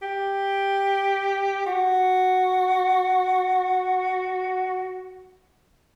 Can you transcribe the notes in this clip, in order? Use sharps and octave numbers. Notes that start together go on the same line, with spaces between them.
G4
F#4